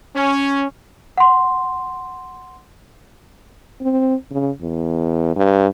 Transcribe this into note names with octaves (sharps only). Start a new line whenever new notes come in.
C#4
F#5 C6
C4
C#3
E2
G2